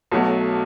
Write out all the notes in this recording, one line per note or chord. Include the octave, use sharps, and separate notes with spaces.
B1 B2 F#3 A3